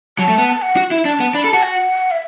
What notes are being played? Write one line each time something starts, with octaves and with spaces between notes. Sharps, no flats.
F#3 A5
A3
B3
A5
F#5
F#4
E4
D4 A5
B3
D4 B5
A4
A5
F#4
F#5
E5